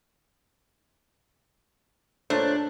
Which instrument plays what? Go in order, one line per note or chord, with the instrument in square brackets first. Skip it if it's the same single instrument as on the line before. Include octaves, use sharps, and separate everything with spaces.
[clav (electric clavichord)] A#2 A3 [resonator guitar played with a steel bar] D4 [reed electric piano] C5 C#5